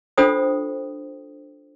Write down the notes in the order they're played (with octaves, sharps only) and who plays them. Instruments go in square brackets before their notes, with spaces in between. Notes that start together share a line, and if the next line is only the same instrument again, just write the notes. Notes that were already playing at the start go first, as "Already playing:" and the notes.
[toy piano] D4 F4 A4 C5 G5 D#6